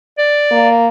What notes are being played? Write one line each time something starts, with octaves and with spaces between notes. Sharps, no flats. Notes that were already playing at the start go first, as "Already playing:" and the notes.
D5
A#3